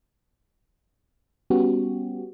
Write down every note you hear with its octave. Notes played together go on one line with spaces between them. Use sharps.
G3 B3 C#4 F#4 G4